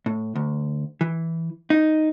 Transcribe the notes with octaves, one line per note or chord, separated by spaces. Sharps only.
A2
D2
E3
D#4